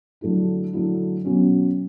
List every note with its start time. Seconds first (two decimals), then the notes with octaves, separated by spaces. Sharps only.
0.21 D3 F#3 A3 E4
0.73 D3 F#3 A3 E4
1.25 B2 F#3 C#4